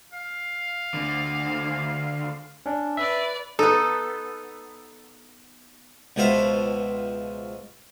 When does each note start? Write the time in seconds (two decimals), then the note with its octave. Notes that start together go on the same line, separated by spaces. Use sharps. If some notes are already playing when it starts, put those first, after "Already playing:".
0.13 F5
0.94 D2 D3
2.66 C#4 D4
2.97 B4 D5 E5
3.59 B3 D#4 A4
6.16 C#2 B2 F3 C5 E5 F5